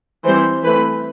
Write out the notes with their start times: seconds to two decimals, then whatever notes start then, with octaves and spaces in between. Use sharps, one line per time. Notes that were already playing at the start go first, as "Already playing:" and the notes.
0.25 E3 G3 C4 C5
0.63 E3 A3 C4 B4